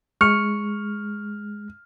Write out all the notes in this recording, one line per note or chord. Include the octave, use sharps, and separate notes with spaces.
G#3 C#6 F6 C#7